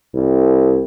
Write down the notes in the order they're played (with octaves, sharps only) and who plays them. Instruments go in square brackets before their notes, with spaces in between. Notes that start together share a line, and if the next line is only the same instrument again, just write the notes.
[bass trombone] C2